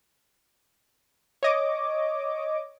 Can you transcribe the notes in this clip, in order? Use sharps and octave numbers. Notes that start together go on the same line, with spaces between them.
C#5 D#5 D6